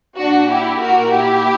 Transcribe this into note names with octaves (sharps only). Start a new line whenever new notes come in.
A#2 D4 F#4
E4 G4
F#4 A#4
E4 G4